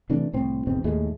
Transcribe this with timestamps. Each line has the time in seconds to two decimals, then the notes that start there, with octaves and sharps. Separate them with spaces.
0.10 C3 E3 A3 D4
0.33 C2 A2 C4
0.67 G#1 E2 B2 C4
0.84 D#2 A2 G#3 A3